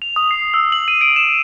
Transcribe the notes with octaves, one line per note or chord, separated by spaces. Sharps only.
F7
D#6
C7
E6
F#7
D#7
D7
E7